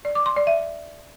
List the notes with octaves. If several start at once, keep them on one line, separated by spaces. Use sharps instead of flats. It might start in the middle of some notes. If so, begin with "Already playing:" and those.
D5
D6
C6
D5
E5